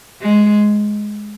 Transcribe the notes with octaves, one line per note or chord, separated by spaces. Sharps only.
G#3